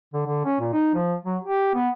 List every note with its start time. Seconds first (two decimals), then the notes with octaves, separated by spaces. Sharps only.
0.14 D3
0.26 D3
0.45 C#4
0.60 A#2
0.73 D#4
0.94 F3
1.25 F#3
1.44 G4
1.74 B3